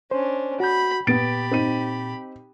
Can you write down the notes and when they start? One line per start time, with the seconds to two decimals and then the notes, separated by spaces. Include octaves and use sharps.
0.11 C#4 D4 C5
0.60 F#4 B5 G6
1.07 A#2 B3 G4 B5 A6 D7
1.51 C4 D#4 D#7